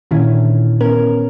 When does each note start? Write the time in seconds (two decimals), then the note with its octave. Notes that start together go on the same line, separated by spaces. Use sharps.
0.11 A#2 D3 D#3 C#4 E4
0.81 B3 C#4 A#4